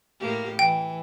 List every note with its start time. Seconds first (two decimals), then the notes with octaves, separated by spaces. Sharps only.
0.19 A2 A#3 G4
0.59 E3 G5